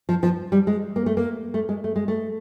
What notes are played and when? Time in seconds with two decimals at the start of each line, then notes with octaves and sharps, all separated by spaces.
0.09 F3
0.23 F3
0.52 G3
0.67 G#3
0.96 A#3
1.06 A3
1.17 A#3
1.54 A3
1.69 G#3
1.84 A3
1.96 G#3
2.08 A3